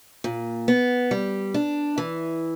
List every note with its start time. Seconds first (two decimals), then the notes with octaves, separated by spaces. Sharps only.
0.24 A#2
0.68 B3
1.11 G3
1.54 D4
1.98 E3